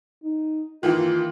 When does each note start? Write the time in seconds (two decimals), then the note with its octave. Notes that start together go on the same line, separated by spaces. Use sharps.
0.23 D#4
0.83 D#3 E3 A#3 F4